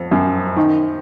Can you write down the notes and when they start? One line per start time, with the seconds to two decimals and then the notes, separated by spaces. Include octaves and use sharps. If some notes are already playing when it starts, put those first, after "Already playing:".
Already playing: F2
0.11 F#2
0.56 D#3